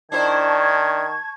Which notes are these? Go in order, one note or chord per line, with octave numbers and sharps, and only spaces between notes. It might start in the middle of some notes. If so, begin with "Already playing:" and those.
D#3 D4 E4 C5 A5 C#6 G#6